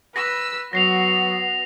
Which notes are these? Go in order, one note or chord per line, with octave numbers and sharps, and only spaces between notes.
B4 E6 A#6
F#3 B3 A#6 C7 F7